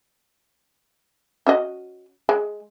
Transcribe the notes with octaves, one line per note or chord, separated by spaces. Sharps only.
C#4 F#4 D#5
G#3